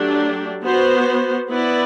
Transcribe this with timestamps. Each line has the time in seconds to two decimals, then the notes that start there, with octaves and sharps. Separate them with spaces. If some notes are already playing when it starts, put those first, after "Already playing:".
Already playing: F#3 A3 D4 G4
0.65 B3 F#4 C5
1.50 B3 E4 B4 D5